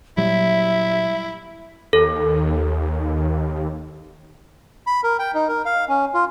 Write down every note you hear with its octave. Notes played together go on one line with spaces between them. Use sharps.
A#2 F#3 G3 E4 E5
D#2 A4
B5
A#4
G5
D#4
A#4
F5
C#4
F4